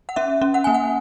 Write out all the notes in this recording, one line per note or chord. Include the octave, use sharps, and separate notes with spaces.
F#5
C#4 E5
C#4
F#5
A#3 G#5
F#5